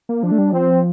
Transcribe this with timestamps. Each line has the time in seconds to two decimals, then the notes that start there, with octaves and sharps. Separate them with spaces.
0.09 A#3
0.23 F3 D4
0.31 A3
0.38 G3
0.53 F3 C4